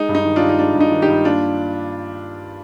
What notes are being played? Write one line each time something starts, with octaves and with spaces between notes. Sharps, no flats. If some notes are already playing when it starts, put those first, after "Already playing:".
Already playing: G#3 D#4
G2
D#4
D#3
D4 F4
G2
D#4
G#3 D4
G2
D#4
D#3
D#4 G4
G2
A#3 D4 F4